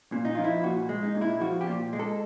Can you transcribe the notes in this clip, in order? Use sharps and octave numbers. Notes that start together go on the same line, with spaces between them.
A#2
D#4
F3 F4
E4
A#2 F#4
G#3
D#4
A#2
E4
F3 F#4
G4
A#2
G#3
A4